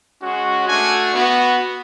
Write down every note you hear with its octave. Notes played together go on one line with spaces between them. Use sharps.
G#3 C#4 F#4
A3 D4 F#4 G#5
B3 F#4